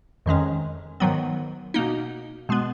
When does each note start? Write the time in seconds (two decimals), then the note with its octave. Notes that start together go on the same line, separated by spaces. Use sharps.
0.26 F2 D#3 G#3 C#4
1.00 G#2 D#3 F#3 B3
1.74 B2 A#3 D#4
2.49 B2 G#3 B3